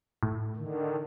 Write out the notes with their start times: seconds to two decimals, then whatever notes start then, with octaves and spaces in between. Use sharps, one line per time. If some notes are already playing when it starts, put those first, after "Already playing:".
0.23 A2
0.56 D3 D#3